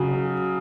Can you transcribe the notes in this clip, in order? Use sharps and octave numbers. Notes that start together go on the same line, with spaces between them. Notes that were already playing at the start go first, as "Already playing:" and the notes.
Already playing: C#3 F#3